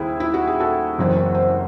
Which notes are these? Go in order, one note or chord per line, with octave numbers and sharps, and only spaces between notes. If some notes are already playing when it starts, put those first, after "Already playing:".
Already playing: D#2 C#3 C4 E4 G#4
E4
F#4
G#4
F#4 A4
F#1 F#2 E3 C4
C5